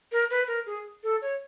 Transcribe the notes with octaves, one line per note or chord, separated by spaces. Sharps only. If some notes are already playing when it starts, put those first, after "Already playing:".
A#4
B4
A#4
G#4
A4
C#5